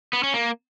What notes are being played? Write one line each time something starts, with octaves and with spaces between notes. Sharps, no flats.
B3
C#4
A#3